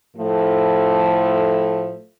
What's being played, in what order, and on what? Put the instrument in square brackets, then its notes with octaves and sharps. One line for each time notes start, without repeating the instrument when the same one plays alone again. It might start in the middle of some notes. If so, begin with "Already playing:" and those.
[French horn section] A2 F3 A3